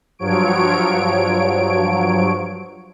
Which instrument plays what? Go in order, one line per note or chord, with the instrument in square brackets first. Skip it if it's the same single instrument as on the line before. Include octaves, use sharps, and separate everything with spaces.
[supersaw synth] G2 F3 F#3 C#5 D7